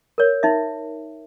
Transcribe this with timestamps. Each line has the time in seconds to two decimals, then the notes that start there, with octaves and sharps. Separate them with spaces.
0.18 A#4 C#5
0.43 D#4 E5